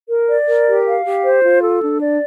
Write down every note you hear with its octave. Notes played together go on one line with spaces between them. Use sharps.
A#4
D5
A#4
G4
F5
G4
C5
F4
A4
D4
D5